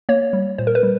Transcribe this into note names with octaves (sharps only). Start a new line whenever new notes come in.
A#3 C#5
G3
A#2 C5
A#4
B4
G3